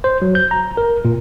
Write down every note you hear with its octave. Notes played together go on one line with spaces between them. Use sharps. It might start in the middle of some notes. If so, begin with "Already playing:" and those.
C5
F#3
G6
A#5
A#4
A#2